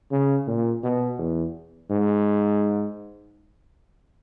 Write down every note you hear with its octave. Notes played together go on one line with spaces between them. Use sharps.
C#3
A#2
B2
E2
G#2